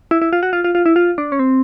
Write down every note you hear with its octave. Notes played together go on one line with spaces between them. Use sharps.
E4
E4
F4
F#4
F4
F4
F4
E4
F4
D4
C#4
C4